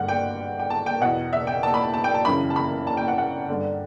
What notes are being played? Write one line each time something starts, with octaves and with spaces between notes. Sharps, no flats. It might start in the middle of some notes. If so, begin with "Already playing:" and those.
Already playing: G2 D3 F#5
G5
G5
A5
G5
E2 B2 F#5
E5
G5
A5
B5
A5
A5
G5
A5
F#2 C#3 E3 B5
A5
B5
A5
G5
F#5
F#5
G2 D3